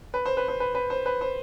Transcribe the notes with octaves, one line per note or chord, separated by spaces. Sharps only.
B4
C5
B4
C5
B4
B4
C5
B4
C5